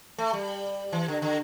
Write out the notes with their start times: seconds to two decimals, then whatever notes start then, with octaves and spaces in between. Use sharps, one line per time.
0.18 A3
0.33 G3
0.93 E3
1.08 D3
1.22 D3